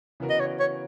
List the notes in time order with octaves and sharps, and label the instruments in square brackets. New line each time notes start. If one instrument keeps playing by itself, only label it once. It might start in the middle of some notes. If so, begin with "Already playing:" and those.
[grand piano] C#3 E3 B3 F#4 A#4
[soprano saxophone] D#5
C#5
C#5